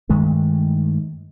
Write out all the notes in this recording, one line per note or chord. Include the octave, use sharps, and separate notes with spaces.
G2 D#3 G#3 A3